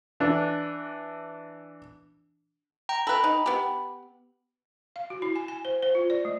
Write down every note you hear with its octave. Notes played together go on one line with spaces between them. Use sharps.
E3 D4
G5 A#5
A4 B4 B5
D#4
B3 G4
F5
F#4
E4
G#5
G#5
C5
C5
F4
D5
A3